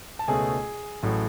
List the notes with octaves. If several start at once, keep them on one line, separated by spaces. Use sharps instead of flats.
A5
C#2 B2 A3 C#4 G#4 G#5
A1 A2 F#3